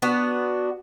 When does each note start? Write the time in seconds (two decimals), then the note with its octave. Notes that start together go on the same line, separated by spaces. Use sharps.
0.02 B3 D4 F#4